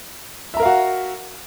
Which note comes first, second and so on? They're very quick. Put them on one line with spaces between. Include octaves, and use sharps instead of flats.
E5 A#5 A#4 F5 F#4